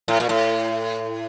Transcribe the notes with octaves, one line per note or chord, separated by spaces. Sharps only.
A2
A#2
A2